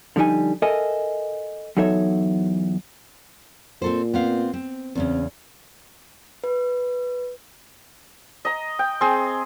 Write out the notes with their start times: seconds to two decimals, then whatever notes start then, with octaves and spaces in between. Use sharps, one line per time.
0.16 D3 F3 G3 D#4 G#5
0.62 A4 A#4 D#5 E5 G#5
1.77 E2 F#3 D#4 A4 C#5 E5
3.82 A#2 C4 A4 C5
4.14 B3 C4 F5
4.54 C4
4.95 E2 C#3 C4 C#4
6.44 B4
8.45 D#5 A#5
8.79 G5
9.01 C4 G#4